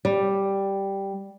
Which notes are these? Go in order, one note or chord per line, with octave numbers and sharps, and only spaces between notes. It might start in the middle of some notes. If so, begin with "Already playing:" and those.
G3